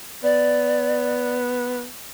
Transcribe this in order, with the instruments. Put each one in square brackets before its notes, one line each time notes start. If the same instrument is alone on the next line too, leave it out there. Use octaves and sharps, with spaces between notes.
[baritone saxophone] B3 [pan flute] D5